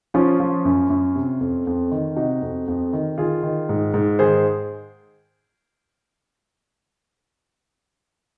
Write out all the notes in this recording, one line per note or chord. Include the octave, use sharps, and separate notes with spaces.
F3 C#4 F4
F3
F#2
F#2
C3
F2
F2
D#3
C3 D#4 F#4
F2
F2
D#3
D#3 F4 G#4
D#3
G#2
G#2
D#3 G#4 C5